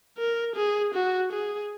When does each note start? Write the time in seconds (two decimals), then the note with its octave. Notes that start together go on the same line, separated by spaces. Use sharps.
0.18 A#4
0.56 G#4
0.94 F#4
1.32 G#4